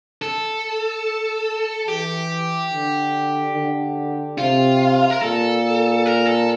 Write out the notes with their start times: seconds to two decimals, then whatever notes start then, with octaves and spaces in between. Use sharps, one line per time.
0.22 A4
1.88 E3 G4
2.71 D3
3.55 D3
4.38 C3 F4
5.10 A#4
5.22 A#2 A4
6.06 A#4
6.26 A4